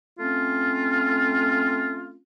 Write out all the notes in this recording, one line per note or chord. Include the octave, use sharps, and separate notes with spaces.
A3 C4 C#4 F4